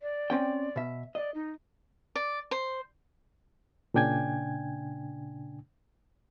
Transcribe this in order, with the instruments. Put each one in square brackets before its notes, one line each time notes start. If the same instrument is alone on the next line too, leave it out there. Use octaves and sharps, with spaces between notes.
[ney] D5
[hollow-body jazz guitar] C4 C#4 G5
B2 E5
[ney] D5 [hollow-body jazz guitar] D#5
[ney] D#4
[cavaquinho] D5
C5
[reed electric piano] A#2 C#3 D4 G5 G#5 G#6